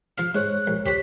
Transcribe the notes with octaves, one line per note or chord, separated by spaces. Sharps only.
F3 F4 F5 F6
G#2 G#3 C5 C#5 F#6
A#1
D2 G4 C5 C#5 B6